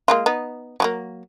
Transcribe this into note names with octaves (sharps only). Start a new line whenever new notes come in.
G#3 A#3 F4
B3 D#4
F#3 G#3 A#3